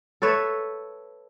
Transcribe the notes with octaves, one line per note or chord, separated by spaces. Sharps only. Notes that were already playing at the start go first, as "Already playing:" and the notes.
A4 B4 C#5 E5